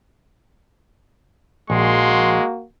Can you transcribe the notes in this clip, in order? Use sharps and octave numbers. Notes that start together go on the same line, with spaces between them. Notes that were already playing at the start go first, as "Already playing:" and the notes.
A#1 G#3 A#3 F#4 C6